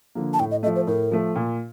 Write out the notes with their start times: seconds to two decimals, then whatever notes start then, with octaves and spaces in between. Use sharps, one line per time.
0.15 D3 F3 A#3
0.33 A5
0.39 A2 G5
0.51 D#5
0.63 A3 D#5
0.66 F3
0.76 C5
0.87 A2 A#4
1.12 F3 A3
1.36 A#2